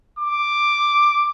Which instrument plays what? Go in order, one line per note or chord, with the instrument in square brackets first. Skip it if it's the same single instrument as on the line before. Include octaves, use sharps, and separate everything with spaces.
[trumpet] D6